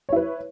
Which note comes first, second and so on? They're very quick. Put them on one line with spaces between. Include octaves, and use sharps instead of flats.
C#5 E4 B4